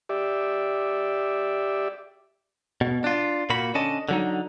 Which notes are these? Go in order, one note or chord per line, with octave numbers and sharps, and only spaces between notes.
G4 D5 E5
B2
D4 F4
A#2 A#3 F#4 B5
D3 C#4 D#5 A5
D3 F#3 D#4